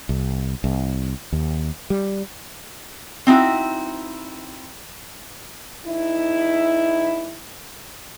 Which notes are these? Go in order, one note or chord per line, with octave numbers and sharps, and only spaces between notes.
C2
C2
D#2
G3
C4 D#4 E4 F#4
E2 D#4 E4